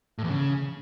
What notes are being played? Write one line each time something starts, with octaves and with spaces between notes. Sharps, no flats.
A2
E2
C#3